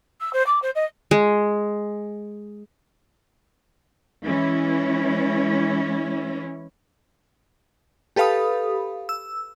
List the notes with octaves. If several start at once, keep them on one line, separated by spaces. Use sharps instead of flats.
E6
C5
D6
C5
D#5
G#3
E3 G#3 C#4 E4
G4 A4 B4 F5 B5 D#6
E6